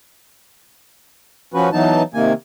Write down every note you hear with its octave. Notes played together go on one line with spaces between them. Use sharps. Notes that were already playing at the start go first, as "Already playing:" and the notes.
F3 C#4 F#4 B4
E3 F#3 B3 D#4 A5
C3 D#3 A#3 G#5